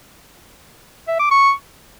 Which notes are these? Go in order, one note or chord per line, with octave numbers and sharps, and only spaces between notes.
E5
D6
C#6